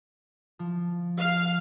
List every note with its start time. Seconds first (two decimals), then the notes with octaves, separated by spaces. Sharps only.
0.59 F3
1.20 F5